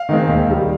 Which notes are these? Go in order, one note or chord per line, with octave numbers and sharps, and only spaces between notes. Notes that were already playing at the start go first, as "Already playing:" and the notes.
Already playing: F5
D#3 G#3 C4
D#2
D#3 G3